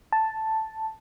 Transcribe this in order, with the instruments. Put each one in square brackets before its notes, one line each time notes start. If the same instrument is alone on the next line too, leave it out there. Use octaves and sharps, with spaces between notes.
[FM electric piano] A5